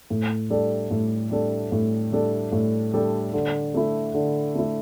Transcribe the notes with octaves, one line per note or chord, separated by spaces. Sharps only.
A2
G3 D4 A4
A2
G3 D4 A4
A2
G3 D4 A4
A2
G3 D4 A4
D3
A3 E4
D3
A3 E4